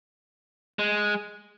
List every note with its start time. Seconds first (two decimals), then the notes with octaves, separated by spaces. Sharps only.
0.79 G#3